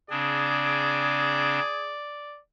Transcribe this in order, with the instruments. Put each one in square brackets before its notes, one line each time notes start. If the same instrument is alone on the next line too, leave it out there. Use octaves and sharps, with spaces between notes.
[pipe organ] C#3 C4 D4 [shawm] G#4 [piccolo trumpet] D5